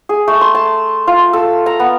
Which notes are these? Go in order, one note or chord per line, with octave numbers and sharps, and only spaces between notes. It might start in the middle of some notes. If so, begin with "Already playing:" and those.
G#4
A3
C6
A5
F4
A4
A#5
B3